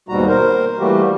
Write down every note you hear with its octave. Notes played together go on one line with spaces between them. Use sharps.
D#2 G#2 B2 G3 F#4 A#5
A#4 C5
E3 G3 A3 A#3 F#4 G4